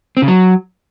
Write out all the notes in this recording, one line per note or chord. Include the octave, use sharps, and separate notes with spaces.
C4
C#3
F#3